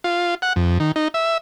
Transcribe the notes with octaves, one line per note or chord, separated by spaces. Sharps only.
F4
F#5
F2
D#3
D#4
E5